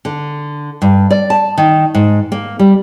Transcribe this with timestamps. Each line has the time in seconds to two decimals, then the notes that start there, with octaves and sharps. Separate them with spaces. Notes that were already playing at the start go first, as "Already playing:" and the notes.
0.05 D3
0.82 G2
1.10 D5
1.30 A5
1.58 D#3
1.95 G#2
2.32 A#3
2.59 G3